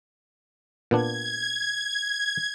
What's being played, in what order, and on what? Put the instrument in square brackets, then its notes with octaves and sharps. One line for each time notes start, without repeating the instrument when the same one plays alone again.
[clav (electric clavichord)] A#2 B3 D4 [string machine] G#6